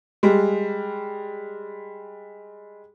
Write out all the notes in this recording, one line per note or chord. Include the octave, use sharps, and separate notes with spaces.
G3 G#3